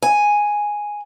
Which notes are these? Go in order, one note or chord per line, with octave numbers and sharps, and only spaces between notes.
G#5